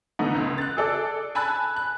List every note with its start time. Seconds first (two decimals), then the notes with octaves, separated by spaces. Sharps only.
0.19 D3 E3 A3 B3 D#4
0.35 C#2
0.58 F#6 A6
0.77 G#4 A4 D5
1.35 G#5 A5 B5 E6 F#6 A6
1.76 F#6